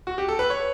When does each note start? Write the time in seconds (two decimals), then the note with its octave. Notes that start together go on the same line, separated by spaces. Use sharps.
0.07 F#4
0.18 G4
0.28 A4
0.39 B4
0.50 C#5